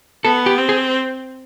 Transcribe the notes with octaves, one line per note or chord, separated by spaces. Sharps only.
B3 A4
G4
C4
G#4